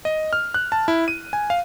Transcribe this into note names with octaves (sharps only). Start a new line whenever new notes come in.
D#5
F6
F#6
A5
E4
D#7
G#5
F5